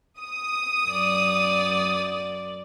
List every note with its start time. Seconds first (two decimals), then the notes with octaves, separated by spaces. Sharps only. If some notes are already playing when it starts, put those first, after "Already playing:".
0.21 D#6
0.87 F#2 D5